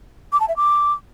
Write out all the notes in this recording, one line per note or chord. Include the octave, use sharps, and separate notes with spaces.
D6
A5
E5
D6